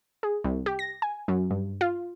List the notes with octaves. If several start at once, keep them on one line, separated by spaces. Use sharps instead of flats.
G#4
C2
G4
A#6
G#5
F#2
G2
F4